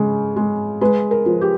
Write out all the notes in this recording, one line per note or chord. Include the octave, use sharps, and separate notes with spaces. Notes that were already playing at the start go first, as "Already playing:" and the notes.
Already playing: C#3 G#3
G#3
G#3 B4
A#4
F3
G4